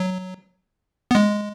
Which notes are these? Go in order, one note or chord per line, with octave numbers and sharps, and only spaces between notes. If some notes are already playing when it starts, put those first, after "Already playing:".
Already playing: F#3
B3
G#3